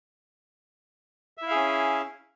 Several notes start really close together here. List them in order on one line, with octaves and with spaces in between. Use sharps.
E5 E4 F5 G#4 C#4